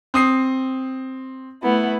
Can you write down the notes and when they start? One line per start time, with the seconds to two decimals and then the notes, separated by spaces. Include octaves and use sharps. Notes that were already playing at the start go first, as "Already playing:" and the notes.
0.14 C4 D#6 C7
1.63 A3 B3 E4